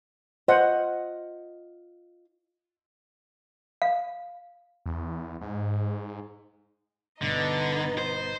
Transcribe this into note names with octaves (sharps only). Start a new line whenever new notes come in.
F4 C5 D#5 F#5
F5
E2
G#2
G1 G2 B2 D3 B3 D#4 D#5
C5